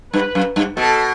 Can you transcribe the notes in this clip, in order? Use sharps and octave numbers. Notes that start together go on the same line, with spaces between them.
G2 B4
F#2
G2
B2 A4